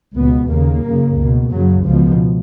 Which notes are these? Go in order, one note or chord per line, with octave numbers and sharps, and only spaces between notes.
C#2 B2 B3
D#2 C#3 A#3
F#2 C#3
C#2 B2
F#2 C#3 F#3
C#2 B2 F3